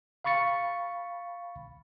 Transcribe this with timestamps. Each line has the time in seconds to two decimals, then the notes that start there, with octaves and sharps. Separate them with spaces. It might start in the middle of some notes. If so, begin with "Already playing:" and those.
0.24 F5 B5 C#6 A6 C#7